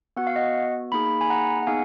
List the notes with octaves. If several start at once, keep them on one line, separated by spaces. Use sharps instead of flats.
B3 F#4 F#5
F5
D#5 F#5
A#3 D#4 G#4 B5
B5
G#5 B5
F#5 A#5
F#5
B3 D#4 G#4 F5 G#5